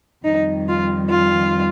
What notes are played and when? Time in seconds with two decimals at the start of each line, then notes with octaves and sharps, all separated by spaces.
0.24 F2 D#3 G3 D#4
0.68 F4
1.10 F4